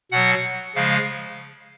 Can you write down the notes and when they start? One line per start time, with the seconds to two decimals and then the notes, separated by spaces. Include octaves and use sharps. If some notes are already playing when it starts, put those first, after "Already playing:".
0.12 B2 F#3 F#5
0.75 C#3 F3 G#3 F5